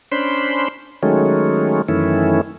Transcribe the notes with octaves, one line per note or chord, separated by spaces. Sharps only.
C#4 D4 C5 B5 C6
D#3 F#3 G#3 A3 C#4
F#2 D#3 E3 A3 C#4 E4